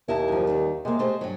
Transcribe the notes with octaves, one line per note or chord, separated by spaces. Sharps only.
D#2 E4 D#5 A5
F#2 F3
D#3 G3
C3 G#3 A#3
A3 G4 C5
G2 F#3